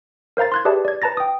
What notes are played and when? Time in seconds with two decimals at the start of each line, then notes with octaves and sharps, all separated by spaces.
0.37 A#4 C5 F5 A#5 A6
0.52 C6 F#6 G#6
0.65 G4 G#4 B4 D5 E5 A5
0.85 D5 G#6
1.02 B4 A5 A#5 A6 A#6
1.17 G5 D#6